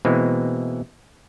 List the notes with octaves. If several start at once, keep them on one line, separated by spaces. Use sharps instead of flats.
B2 E3 G#3 A#3 C4